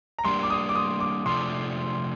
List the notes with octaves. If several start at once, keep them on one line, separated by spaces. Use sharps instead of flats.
A#5
G3 A#3 D4 C6
D6
D#6
D6
D#6
D6
C3 F3 A3 D4 A4 C6